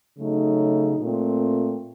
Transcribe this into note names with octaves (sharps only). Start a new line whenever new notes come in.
C#3 F#3 A3 D#4
A#2 A3 C4